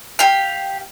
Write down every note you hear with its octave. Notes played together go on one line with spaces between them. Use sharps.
G4 F5